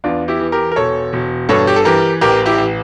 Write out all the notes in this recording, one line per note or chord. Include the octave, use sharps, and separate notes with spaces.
E2 D4 F4
E4 G4
E3
G4 A#4
A#4
E1 A4 C#5
E1
G2 A4 C#5
G4
A4
E3 G4 A#4
A1 G4 A#4
E4 G4
A1